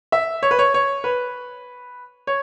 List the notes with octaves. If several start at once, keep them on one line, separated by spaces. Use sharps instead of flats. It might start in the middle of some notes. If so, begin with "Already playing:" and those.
E5
C#5
B4
C#5
C#5
B4
C#5